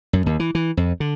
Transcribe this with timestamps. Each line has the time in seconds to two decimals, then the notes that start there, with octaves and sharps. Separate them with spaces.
0.13 F#2
0.26 D#2
0.40 E3
0.55 E3
0.77 F2
1.00 D3